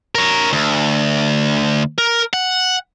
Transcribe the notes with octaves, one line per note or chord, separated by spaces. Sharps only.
A#4 C#5
D2
A#4
F#5